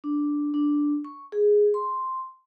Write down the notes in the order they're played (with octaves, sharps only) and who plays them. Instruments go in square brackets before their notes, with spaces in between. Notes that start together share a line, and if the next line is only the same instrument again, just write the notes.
[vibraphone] D4
D4
C#6
G#4
C6